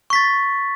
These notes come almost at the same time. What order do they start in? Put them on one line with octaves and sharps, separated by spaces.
C#6 B6 A6